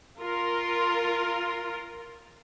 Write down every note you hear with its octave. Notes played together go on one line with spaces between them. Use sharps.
F4 A#4